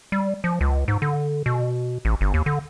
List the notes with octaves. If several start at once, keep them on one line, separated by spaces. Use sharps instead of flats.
G3
F3
C#2
G#2
D3
B2
A1
G1
D#2
D3